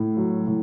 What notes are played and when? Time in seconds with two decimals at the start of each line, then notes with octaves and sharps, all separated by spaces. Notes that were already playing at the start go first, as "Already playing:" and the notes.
Already playing: A2
0.17 F#3
0.47 A2